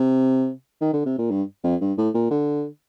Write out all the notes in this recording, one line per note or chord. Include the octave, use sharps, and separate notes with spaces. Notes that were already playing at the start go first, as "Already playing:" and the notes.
Already playing: C3
D#3
D3
C3
A#2
G2
F2
G2
A2
A#2
D3